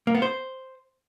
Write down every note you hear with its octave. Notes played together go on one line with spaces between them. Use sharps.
A#3
B3
C5